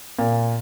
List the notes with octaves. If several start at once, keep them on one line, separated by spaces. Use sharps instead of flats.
A#2